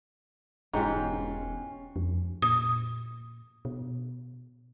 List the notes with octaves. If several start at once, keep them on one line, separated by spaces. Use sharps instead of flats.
E1 G#2 C#4 F4 G4 A#5
F2
A#2 D#6
B2